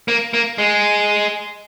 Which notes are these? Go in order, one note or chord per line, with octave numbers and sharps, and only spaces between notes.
A#3
A#3
G#3